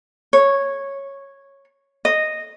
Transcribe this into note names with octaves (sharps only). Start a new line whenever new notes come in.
C#5
D#5